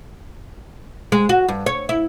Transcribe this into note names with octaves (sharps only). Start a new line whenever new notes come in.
G#3
F#4
G2
C#5
E4